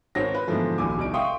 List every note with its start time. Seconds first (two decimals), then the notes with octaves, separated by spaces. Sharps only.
0.15 G#1 C5 C#5 A#6
0.34 B4
0.47 G#2 B2 D3 E3 F3 A3
0.78 E1 A#1 D#2 G#5 D6
0.98 E1 C2 D#4 D7
1.14 E5 F5 G5 C6 C#6 D#6